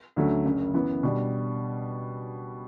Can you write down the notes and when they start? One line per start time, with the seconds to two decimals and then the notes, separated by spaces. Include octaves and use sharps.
0.16 D2 D3 F#3 A3 C#4
0.45 F#1 F#2 C#3
0.74 F#2 E3 B3
1.03 B2 G3 D4